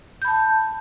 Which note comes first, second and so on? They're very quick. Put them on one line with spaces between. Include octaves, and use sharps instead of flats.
G6 B5 A5